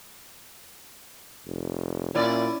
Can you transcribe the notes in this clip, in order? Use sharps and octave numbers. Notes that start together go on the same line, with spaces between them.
F1
A#2 C#4 E4 D5